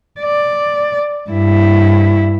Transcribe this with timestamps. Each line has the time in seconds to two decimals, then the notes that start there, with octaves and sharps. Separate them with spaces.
0.20 D5
1.30 G2 E4